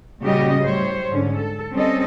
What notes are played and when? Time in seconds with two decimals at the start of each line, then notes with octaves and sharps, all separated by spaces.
0.21 A#2 C#3 G3 F#4 G4 D#5
0.61 A2 G3 C5 C#5
1.09 G#2 D3 C#4
1.38 A4
1.73 G3 C4 C#4 A4 D#5